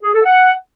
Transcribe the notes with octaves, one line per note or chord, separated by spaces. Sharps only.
G#4
A4
F#5